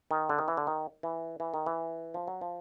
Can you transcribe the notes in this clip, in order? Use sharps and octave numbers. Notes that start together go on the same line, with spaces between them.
D#3
D3
D#3
E3
D3
D#3
E3
E3
D#3
E3
F3
F#3
F3